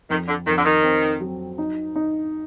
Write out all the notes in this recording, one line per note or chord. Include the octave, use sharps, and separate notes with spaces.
F2 D#3
D3
F2 D#3
D3
D#3
C4
F#3
D#4
D#4